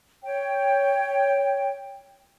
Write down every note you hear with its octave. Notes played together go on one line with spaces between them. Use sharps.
C#5 G5